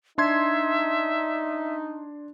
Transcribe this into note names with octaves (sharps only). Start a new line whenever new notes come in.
D4 D#4 E5 C6 G#6